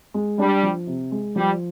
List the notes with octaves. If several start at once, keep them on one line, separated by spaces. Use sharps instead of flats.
G#3
G3 D4
F3
C3
G#3
F3 G3